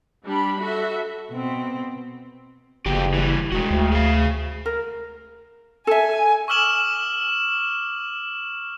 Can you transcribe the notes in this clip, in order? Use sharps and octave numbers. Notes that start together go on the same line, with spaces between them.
G3 D4 B5
F#4 A4 E5
B2 C4
F#1 F2 F#4 G4
E3 G3
E1 G#3 F#4
D2
G#4 F5
A#4
A4 E5 G#5
C#6 D6 E6 F6 E7 F#7